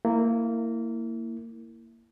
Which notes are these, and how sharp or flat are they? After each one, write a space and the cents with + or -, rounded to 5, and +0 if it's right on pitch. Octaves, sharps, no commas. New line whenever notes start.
A#3 -20 E4 +0